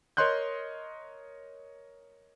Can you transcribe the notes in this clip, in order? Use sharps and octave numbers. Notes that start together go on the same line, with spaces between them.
A#4 C#5 D#5 C6 F#6 G6